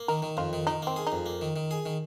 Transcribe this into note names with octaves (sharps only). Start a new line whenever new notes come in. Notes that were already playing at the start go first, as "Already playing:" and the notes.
Already playing: A#3
D#3 A#4
D#3
F2 F4
D#3
D#3 D#4
A#3 C4
G#4
D#4
F2
A#3
D#3
D#3
G#4
D#3